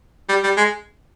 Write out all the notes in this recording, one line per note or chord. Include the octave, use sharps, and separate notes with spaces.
G3
G3
G#3